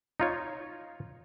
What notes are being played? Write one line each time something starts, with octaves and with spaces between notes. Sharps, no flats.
D#4 F4 C#5